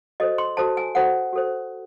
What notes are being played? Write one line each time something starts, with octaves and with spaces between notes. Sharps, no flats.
F#4 A4 C5 D#5
C6
F#4 A4 C5 A5
G#5
F#4 A4 C5 F#5
F#4 A4 C5